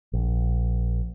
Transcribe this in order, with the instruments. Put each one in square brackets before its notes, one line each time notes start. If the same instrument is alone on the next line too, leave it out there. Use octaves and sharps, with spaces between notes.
[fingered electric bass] A#1